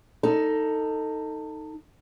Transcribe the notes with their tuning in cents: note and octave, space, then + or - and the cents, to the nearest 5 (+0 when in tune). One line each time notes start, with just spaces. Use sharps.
D#4 +5 A4 +20